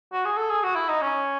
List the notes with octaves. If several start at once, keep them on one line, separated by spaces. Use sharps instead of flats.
F#4
G#4
A4
G#4
F#4
E4
D#4
C#4